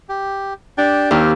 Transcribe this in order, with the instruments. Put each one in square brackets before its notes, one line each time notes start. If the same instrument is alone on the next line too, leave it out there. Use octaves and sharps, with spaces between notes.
[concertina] G4
[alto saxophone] D4 [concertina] G4 G5 A5
[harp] D#2 [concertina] C4 G4 F6